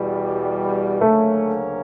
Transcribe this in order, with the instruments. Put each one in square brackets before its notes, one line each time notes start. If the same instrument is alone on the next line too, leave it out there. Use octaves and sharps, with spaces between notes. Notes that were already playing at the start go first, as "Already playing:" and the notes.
Already playing: [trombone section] E2 B2 G3
[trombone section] D2 C#3 F#3 A#3 C#4 [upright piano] A3